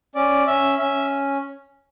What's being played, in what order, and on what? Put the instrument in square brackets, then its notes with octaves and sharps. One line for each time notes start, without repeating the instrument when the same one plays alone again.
[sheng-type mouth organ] C#4 D5
C#4 E5
C#4 E5